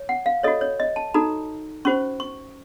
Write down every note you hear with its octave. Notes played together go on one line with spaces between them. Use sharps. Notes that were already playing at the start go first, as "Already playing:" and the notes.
Already playing: C#5
F#5
F5
F#4 A4 C#5 D#5
C#5
D#5
A5
D#4 F#4 A4 A#5
C#4 F#4 C5 C#6
C#6